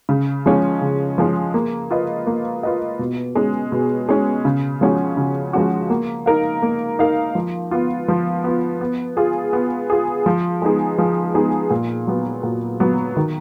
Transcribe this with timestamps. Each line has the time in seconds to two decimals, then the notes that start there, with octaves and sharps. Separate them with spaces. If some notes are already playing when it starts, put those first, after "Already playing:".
0.09 C#3
0.46 F3 G#3 C#4
0.81 C#3
1.18 F3 G#3 C#4
1.54 A#3
1.91 F4 B4 D#5
2.27 A#3
2.63 F4 B4 D#5
2.99 B2
3.35 G#3 C#4
3.72 B2
4.09 G#3 C#4
4.45 C#3
4.81 F3 G#3 C#4 F#4
5.17 C#3
5.53 F3 G#3 C#4 F#4
5.90 A#3
6.26 D#4 A#4 F5
6.62 A#3
6.99 D#4 A#4 F5
7.35 F3
7.71 B3 F4
8.08 F3
8.44 B3 F4
8.81 B3
9.17 F4 G#4
9.53 B3
9.90 F4 G#4
10.26 F3
10.62 G#3 B3 D#4 G#4
10.98 F3
11.34 G#3 B3 D#4 G#4
11.70 A#2
12.07 F#3 B3
12.43 A#2
12.80 F#3 B3
13.17 D#3